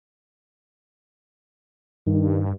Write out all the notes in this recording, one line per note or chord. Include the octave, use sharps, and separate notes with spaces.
G2 D#3